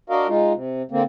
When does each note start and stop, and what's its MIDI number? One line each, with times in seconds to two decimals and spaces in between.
0.10 0.27 62
0.10 0.27 66
0.10 0.27 70
0.10 0.27 75
0.10 0.27 77
0.28 0.53 56
0.28 0.53 63
0.28 0.53 65
0.54 0.82 48
0.91 1.03 50
0.91 1.03 58
0.91 1.03 60